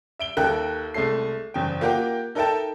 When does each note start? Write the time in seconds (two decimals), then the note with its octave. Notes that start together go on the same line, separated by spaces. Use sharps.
0.19 E5 D7 G7
0.37 D#2 A4 A#4 E5 G5 F#6
0.94 C2 G#3 A3 A4 C7
1.54 F#1 E2 G5
1.81 A#3 F4 G4 A#4 F#5 G5
2.35 D#4 A4 A#4 E5 G5 A5